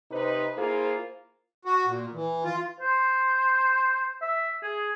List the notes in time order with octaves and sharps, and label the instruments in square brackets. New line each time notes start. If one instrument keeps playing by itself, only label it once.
[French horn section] C3 D#4 B4 C5
A#3 E4 F4 G#4 C5
[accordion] F#4
A#2
E3
F4
[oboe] C5
E5
G#4